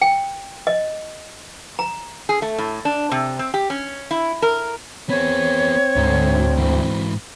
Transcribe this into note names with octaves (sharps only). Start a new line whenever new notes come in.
G5
D#5
A#5
G#4
A3
A2
D4
C3
C4
G4
C#4
E4
A#4
B3 C4 G#4 C#5
D2 G#2
G#2 E3